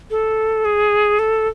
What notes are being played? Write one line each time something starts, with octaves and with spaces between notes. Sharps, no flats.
A4
G#4
A4